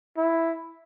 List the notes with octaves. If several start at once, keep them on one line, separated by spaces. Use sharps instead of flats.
E4